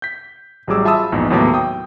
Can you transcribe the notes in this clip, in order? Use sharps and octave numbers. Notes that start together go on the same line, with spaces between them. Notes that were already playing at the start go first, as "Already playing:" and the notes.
G6 B6
A1 F#3 G3 G#4 D6 E6
F4 E5 A5 B5 D#6 E6
A#1 E2 G#2
D#2 A2 C3 F#3 B3 D6
G5 D#6